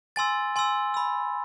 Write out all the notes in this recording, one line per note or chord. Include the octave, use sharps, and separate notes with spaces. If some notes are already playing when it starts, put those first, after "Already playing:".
G#5 C6 E6 A6
G#5 C6 E6
B5 E6